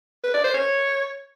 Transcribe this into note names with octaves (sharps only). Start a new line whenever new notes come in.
B4
D5
C5
C#5